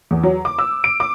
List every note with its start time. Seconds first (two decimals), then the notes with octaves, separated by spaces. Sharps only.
0.11 E2
0.23 F#3
0.45 D6
0.59 E6
0.84 D7
1.00 D6